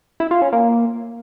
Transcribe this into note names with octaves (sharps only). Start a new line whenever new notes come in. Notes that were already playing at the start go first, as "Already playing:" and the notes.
E4
F4
C#4
A#3